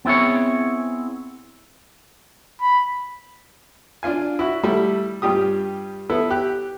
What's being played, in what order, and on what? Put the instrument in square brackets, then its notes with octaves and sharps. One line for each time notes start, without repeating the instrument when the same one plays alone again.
[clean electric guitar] B3 C4 E4 G#4 C#5
[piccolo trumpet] B5
[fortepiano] D4 F4 F5 G#5
E4 F#4
G3 A3 E4
G2 G3 F4 G4 D#6
B3 E4 A4
G4 F#6